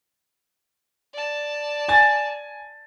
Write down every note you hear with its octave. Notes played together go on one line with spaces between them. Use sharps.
D5 A5
G#5 A6